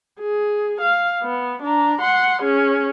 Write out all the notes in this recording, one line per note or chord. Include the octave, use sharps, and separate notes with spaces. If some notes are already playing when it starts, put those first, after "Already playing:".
G#4
F5
B3
D4 A#5
F#5 C6
C#4 G#4